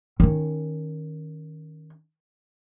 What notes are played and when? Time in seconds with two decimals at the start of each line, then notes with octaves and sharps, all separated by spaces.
0.20 D#3 C#4